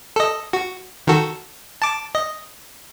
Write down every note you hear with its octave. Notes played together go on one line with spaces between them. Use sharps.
A4 D#5
F#4
D#3 F#4 A4
A5 D6
D#5